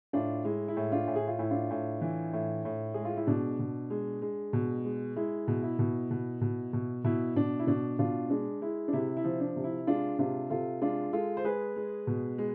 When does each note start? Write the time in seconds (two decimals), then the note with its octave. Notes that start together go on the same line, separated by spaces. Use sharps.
0.13 A2 D4 F4
0.45 G#3 E4
0.68 E4
0.77 A2
0.92 D4 F4
1.08 A2
1.16 G#4
1.28 F4
1.39 A2 E4
1.51 D4 F4
1.71 A2
2.01 E3
2.33 A2
2.65 A2
2.94 G#3 G#4
3.05 F4
3.17 E4
3.27 B2 D4
3.59 B2
3.90 G#3
4.22 G#3
4.53 B2
4.85 G#3
5.16 G#3 E4
5.48 B2
5.63 E4
5.79 B2
6.11 B2
6.41 B2
6.73 B2
7.04 B2 E4
7.36 B2 D4
7.59 E4
7.67 B2 D4
7.99 B2 D4 F4
8.30 G#3 D4
8.62 G#3 E4
8.88 D4
8.93 C3 E4
9.17 E4
9.25 F3
9.40 D4
9.56 C3
9.64 E4
9.87 G#3 D4 F4
10.19 C3 D4 F4
10.50 C3 F4 A4
10.81 G#3 D4 F4
11.13 G#3 F4 A4
11.37 C5
11.44 G#3 G#4 B4
11.76 G#3
12.07 B2
12.38 G#3